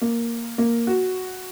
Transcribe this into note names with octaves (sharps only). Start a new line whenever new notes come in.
A#3
A#3
F#4